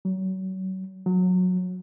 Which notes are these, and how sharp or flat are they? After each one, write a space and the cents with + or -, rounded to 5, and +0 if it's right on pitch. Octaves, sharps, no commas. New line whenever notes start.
F#3 +30
F#3 -20